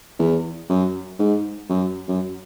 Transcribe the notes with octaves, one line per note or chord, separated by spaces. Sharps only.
E2
F#2
G#2
F#2
F#2